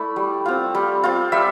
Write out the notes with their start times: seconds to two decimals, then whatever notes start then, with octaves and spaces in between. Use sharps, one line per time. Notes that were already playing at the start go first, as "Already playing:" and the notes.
Already playing: A3 E4 D5
0.16 G3
0.46 C4 F4
0.75 G3
1.04 C4 F4
1.32 G3 E5